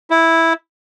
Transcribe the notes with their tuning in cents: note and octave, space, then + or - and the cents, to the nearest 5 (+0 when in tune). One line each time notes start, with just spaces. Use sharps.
E4 -5